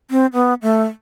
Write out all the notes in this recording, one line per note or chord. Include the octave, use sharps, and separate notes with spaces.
C4
B3
A3